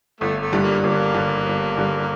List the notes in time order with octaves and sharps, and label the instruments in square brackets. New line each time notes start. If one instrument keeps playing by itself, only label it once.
[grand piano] G1 [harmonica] A3
[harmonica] A3
[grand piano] G2 D3 G3
[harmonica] A#3
[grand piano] G1 [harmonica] A#3
[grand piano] G2 D3 G3
G1
G2 D3 G3